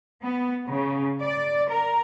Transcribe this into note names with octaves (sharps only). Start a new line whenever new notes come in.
B3
C#3
D5
A#4